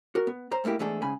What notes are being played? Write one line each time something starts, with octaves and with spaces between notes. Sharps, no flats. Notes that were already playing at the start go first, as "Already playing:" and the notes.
F#4 A#4
B3
C5 A#5
G#2 A3 A#3 E4 G4
E2 G#2 A3 D4 G#4 A4
G#2 C#3 G#5 B5